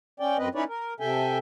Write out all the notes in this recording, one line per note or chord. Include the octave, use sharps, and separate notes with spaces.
C#4 D5 G5
F#2 C4 B4 D#5
C#4 D#4 E4 B4 C#5 D5
A#4
C3 A4 E5 G5 G#5